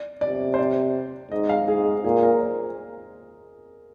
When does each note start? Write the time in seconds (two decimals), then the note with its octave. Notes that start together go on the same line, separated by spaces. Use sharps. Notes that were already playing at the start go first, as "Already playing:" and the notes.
Already playing: D5
0.21 C3 D5
0.54 C5
0.59 D5
1.31 G#2 D#5
1.49 F5
1.68 G#2 G#4
2.04 A#2 G#4
2.23 A#4
2.41 C5